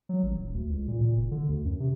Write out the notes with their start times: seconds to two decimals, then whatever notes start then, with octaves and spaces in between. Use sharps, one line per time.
0.09 F#3
0.23 A1
0.36 D#1
0.54 D2
0.70 C#2
0.88 A#2
1.01 A#2
1.16 F#1
1.31 D3
1.48 D2
1.65 F#2
1.80 C3